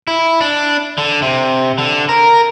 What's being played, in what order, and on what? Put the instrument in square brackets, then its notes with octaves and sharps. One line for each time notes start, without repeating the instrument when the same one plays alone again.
[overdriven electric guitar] E4
D4
D3
C3
D3
A#4